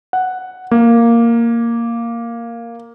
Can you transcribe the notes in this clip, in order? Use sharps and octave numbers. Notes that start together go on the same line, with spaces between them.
F#5
A#3